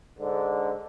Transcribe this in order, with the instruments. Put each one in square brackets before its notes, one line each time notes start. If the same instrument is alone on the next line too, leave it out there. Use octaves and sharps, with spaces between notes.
[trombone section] G#2 D3